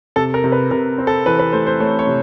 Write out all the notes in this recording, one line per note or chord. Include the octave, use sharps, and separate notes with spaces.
C3 A4
A#4
C3
B4
C3 A#4
C4
A4
E3 B4
B4
A3 C5
C5
A3 C#5
C#5
C3